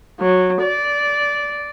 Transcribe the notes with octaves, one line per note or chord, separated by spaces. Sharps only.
F#3
D5